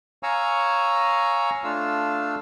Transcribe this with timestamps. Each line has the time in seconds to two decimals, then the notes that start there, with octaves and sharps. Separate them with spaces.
0.23 C#5 F5 G#5 A#5 C#6 E6
1.64 A3 D4 F4 F5 E6